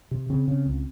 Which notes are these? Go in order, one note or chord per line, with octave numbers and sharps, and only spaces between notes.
C3
C#3 C4
C#3
C#2